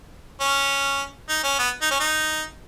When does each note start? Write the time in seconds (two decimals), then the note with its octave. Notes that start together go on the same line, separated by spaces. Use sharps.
0.41 C#4
1.29 D#4
1.44 C#4
1.59 B3
1.81 D#4
1.91 C#4
2.00 D#4